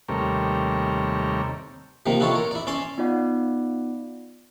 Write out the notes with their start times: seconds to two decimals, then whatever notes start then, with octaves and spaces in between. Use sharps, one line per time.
0.08 D#2 C3 G3 A3 A#4 C#5
2.06 C3 D#3 F3 A#3
2.20 D4 E4 F4 A4 C#5
2.35 A#4
2.51 E4 D5
2.67 C#4 D5 A5 C6
2.98 B3 D#4 F4 D5 F#5